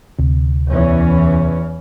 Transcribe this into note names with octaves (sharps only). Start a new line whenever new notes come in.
D2 C3
E2 E3 C#4